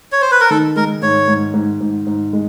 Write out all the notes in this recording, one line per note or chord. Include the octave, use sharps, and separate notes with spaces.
C#5
C5
B4
A#4
D#3 A4
G#3 A#4
G#2 C#5
G#2
G#2
G#2
G#2
G#3